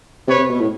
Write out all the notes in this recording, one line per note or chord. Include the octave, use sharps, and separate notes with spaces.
C3 B4 C#5
C3
B2
A2